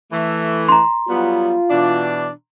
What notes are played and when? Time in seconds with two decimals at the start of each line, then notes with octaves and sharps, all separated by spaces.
0.11 E3 A3
0.69 A#5 C6
1.09 F#3 G3 B3 F4
1.70 B2 E3 D4